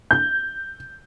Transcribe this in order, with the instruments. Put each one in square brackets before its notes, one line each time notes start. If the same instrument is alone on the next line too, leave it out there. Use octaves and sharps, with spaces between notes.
[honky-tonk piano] G6